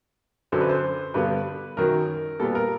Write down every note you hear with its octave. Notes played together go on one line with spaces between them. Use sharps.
F#2 D3 F#3 C5
B4
C5
G2 D3 G3 B3 B4
F#2 D#3 F#3 A#4
A#2 G3 B3 A4
A#4